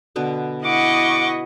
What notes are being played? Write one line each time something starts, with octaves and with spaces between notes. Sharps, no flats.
B2 D3 B3
E4 D#5 F#5 C#6 D6